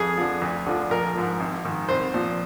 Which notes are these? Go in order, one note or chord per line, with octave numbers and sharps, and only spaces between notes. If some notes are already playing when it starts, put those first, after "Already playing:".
Already playing: F2 G#4
D3 F3
D2
D3 F3
A#1 A#4
G#2 F3
G#1
G#2 D#3
C2 C5
A#2 F3